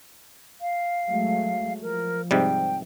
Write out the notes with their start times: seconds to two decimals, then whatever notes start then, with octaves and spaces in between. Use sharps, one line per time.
0.61 F5
1.06 F#3 G#3 A3
1.81 F3 A#4
2.31 G#2 C3 G3 G5